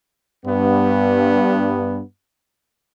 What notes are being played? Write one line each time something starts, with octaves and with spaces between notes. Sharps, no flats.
G2 B3